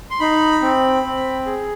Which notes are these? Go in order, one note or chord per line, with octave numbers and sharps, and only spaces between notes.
C6
D#4 B5
C4
C4
G#4